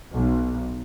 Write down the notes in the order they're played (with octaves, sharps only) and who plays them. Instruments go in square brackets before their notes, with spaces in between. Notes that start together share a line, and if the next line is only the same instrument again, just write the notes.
[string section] B1